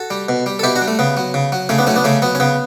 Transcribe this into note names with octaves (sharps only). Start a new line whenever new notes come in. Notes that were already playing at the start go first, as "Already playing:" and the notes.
Already playing: F#4 A4
G3
B2
G3
A4
B2 E4 G4
D4 F#4
G3
A3
C#3 B3
F#3
C#3
F#3
C#3 A3 C#4
B3 D4
F#3 A3 C#4
B3 D4
C#3 A3 C#4
F#3 B3
C#4
C#3 B3